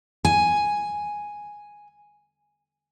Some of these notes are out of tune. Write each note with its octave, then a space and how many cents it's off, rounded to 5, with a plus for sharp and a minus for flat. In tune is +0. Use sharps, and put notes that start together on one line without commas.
G#5 +0